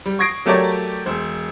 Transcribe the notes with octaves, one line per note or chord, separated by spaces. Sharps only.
G3
C#6 D#6 G#6 A#6 C7 D7
F#3 A3 G4 A#4 C#5 D5
E1 C5